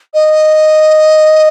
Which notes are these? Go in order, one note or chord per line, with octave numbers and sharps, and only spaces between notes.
D#5